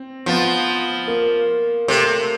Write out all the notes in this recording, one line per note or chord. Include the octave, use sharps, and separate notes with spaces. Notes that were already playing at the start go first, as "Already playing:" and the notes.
Already playing: C4
F3 B3
A#3
C3 A3